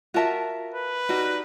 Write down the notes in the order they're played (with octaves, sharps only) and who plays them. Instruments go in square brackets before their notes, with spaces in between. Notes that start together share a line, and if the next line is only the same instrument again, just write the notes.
[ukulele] F4 A5 [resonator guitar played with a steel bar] F#4 A#4 E5
[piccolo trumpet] B4
[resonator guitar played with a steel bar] G3 D#4 [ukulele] F#4